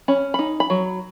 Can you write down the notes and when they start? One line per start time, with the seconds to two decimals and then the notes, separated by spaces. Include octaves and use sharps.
0.08 C#4 B5
0.34 D#4 B5
0.60 B5
0.70 F#3